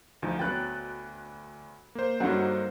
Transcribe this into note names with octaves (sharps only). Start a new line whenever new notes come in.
D2 F3 D#4
D2 F#3 B3 G5 F#6 A6
A#3 C5
G2 D3 F#3 D#4 F#4